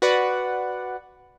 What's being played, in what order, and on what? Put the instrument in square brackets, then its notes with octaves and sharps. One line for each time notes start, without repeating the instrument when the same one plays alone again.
[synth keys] F#4 B4 D5 F#5